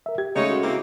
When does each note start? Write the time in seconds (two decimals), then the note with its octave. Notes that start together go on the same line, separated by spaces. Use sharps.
0.06 A#4 E5
0.18 G4 G#6
0.36 C#3 G#3 A3 D#4 C#5
0.50 F#4
0.63 A#3 C4 E4